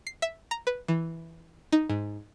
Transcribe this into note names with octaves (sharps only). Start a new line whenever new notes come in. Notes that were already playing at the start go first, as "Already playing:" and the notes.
C7
E5
A#5
B4
E3
D#4
G#2